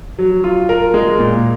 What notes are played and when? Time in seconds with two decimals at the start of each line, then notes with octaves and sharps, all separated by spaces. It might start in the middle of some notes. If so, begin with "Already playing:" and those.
0.19 F#3
0.44 F4
0.69 A#4
0.94 G#3
1.19 A#2